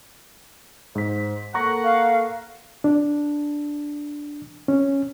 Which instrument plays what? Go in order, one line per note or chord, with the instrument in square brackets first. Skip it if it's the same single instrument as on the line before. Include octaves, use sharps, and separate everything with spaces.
[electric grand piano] G#2 B6 [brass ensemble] C5
[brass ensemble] A#3 A4 [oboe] F#5 [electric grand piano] A#5 C#6 A#6
[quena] F5
[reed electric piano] D4
C#4